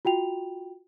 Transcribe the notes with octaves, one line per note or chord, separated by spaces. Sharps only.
F4 F#4 G5 F7